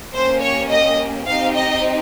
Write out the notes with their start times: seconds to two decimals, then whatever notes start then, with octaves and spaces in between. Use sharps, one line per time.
0.13 A#3 C#4 G4 C5
0.40 C#5
0.69 D#5
1.26 C4 D#4 G4 F5
1.54 D#5